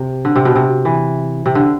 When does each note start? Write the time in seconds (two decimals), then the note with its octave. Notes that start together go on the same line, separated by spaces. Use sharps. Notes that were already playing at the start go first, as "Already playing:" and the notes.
Already playing: C3
0.25 D3
0.36 C3
0.45 B2
0.55 C3
0.85 E3
1.46 C3
1.55 D3